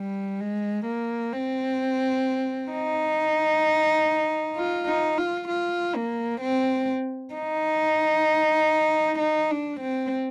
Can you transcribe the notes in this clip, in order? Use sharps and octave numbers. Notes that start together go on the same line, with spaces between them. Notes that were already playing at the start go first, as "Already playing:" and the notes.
Already playing: G3
G#3
A#3
C4
D#4
F4
D#4
F4
F4
A#3
C4
D#4
D#4
D4
C4